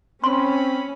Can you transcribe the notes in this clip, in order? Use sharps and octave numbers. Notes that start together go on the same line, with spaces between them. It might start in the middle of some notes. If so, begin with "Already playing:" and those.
C4 C#4 B5 C6